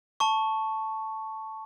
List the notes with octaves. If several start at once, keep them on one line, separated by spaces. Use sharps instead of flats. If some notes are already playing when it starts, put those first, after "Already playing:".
A5 C#6